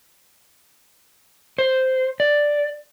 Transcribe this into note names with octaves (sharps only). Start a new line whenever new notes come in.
C5
D5